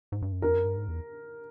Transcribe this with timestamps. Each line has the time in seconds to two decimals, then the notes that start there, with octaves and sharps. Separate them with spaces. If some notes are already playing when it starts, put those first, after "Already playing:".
0.12 G#2
0.22 G2
0.32 F#2
0.42 F2 A#4
0.55 F#2
0.65 G2
0.77 G#2
0.88 E2